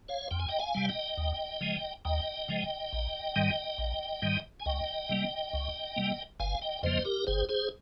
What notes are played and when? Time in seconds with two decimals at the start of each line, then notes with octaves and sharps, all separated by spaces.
0.08 C#5 F5
0.31 F2 G5
0.39 G#5
0.49 D#5 G5
0.60 F5 G#5
0.75 C3 G3
0.89 D#5 G5
1.17 D#2
1.61 C#3 F3 G#3
2.05 D#2 D#5 G5
2.48 C#3 F3 G#3
2.92 A#1
3.36 G#2 D#3 G3
3.78 A#1
4.22 G#2 D#3 G3
4.60 G#5
4.66 C#2 D#5 G5
5.09 C3 G3 A#3
5.53 C#2
5.96 C3 G3 A#3
6.40 G1 F5 G#5
6.62 D#5 G5
6.83 F2 C#3 F3 A#3 C5 D#5
7.05 G4 A#4
7.27 G1 G#4 C5
7.49 G#4 C5